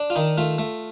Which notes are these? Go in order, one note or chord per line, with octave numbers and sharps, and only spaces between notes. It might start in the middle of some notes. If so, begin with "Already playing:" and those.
Already playing: D4
F4
D#3 D#4
A3 F4
A3